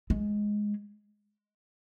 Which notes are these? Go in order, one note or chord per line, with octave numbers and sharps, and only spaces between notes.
G#3